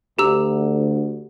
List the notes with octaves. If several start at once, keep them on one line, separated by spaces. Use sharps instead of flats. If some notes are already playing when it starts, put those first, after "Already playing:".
D2 G4 A#5 E6